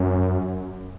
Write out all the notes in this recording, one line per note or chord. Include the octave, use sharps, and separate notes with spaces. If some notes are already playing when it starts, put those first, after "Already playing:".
Already playing: F#2